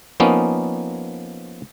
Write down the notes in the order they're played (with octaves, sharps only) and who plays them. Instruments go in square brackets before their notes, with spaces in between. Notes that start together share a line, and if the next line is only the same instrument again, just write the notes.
[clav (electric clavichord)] F3 A#3 B3 C#4 D#4